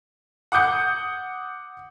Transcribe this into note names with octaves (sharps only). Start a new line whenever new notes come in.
F#5 D6 D#6 G6 C#7